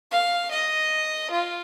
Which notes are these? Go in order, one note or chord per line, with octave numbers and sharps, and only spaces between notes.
F5
D#5
F4